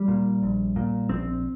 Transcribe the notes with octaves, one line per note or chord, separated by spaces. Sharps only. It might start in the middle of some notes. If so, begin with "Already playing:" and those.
Already playing: G3
A#2
A#1
A#2
A#1 C4